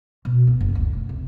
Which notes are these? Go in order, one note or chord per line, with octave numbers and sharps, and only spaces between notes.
B2
B3
F#1
D2
C#3
C3